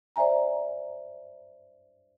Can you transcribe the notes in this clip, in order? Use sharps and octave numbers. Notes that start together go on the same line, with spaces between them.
C5 D5 E5 G#5 A#5